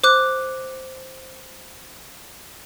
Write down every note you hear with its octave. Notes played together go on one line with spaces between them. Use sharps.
C5 D6 F#6